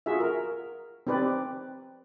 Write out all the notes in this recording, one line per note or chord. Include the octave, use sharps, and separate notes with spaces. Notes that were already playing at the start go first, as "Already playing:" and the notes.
F4 F#4 G#4 E5
A#4
C4 D#4 G4 B4 D5